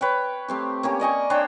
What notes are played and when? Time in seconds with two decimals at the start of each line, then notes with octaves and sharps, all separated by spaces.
0.01 B4 C#5 G5
0.48 A3 C4 G4
0.83 A#3 C#4 G4
1.00 D5 D#5 G#5 C#6
1.30 D4 C5 C#5 G5